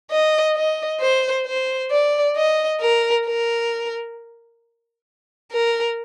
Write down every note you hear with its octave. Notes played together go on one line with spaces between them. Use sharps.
D#5
D#5
C5
C5
D5
D#5
A#4
A#4
A#4